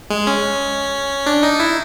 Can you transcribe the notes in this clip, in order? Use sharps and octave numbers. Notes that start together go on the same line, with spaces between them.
G#3
C#4
D4
D#4
E4